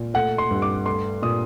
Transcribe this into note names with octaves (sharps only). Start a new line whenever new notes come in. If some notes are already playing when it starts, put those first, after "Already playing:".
Already playing: A#2
A3 F#5
C6
G2
D6
A3 C6
A#2 D#6